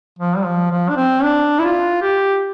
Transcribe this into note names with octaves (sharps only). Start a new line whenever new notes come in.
F3
G3
F3
F3
D4
C4
D4
E4
F4
G4